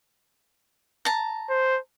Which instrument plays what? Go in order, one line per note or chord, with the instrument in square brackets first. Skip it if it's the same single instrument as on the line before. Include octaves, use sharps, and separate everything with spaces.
[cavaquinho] A5 A#5
[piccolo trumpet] C5